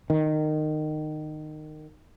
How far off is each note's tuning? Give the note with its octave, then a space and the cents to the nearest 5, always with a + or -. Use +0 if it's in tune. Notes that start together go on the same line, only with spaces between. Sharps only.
D#3 -20